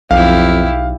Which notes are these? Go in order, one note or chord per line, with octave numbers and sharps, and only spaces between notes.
B1 F2 E4 G4 F5